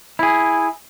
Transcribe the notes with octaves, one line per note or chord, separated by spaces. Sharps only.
E4 G#4